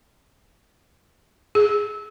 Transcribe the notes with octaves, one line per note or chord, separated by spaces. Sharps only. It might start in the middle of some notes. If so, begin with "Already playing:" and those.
G#4